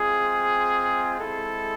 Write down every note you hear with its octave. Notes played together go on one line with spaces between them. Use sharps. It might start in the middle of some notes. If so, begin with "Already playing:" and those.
Already playing: G#3 C4 F4 G#4
G#3 C4 E4 A4